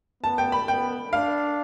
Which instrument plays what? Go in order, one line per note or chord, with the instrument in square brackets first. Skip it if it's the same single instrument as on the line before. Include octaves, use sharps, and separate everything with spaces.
[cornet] B3 [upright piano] A5
[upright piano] G5
B5
[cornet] B3 [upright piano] G5
[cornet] D4 [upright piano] F5